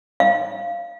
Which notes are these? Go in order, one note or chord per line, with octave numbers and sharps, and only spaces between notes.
F5